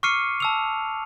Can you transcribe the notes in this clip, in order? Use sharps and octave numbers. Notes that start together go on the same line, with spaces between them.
C#6 D6 F6 C7 C#7 D#7
A5 E6 F7